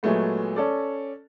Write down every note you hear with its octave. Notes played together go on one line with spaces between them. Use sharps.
A#2 F#3 G#3 A3 B3
C#4 A4 D5